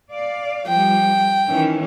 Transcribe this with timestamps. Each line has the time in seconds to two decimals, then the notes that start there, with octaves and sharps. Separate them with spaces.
0.10 D5 F5
0.68 F3 G3 G5
1.48 D#3 E3 C#4